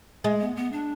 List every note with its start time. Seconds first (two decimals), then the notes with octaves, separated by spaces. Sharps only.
0.24 G#3
0.41 B3
0.56 B3
0.72 D4